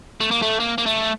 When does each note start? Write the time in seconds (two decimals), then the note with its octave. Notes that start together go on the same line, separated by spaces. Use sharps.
0.20 A3
0.31 A#3
0.42 A3
0.60 A#3
0.78 A#3
0.86 A3